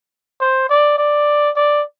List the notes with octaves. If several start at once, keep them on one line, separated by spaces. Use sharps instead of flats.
C5
D5
D5
D5